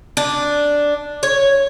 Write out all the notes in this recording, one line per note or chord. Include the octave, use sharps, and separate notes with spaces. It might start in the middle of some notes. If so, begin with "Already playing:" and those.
D4
C#5